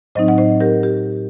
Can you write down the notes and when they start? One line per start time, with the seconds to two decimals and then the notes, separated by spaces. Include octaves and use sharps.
0.15 A2 F#3 C4 D#4 C5 D#5
0.28 F#5
0.38 C5 D#5
0.61 G4 A#4
0.83 G4